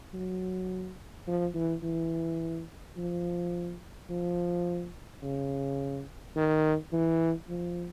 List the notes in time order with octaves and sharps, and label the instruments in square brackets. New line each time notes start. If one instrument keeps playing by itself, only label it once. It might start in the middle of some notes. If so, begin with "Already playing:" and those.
[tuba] F#3
F3
E3
E3
F3
F3
C#3
D#3
E3
F3